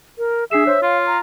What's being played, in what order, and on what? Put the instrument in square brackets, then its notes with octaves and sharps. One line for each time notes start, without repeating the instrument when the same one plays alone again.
[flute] A#4
[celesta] D4 C7 E7 [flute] G#4 [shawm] E5
[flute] C5 [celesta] C#5
[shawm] F4 [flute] F5
[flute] A#5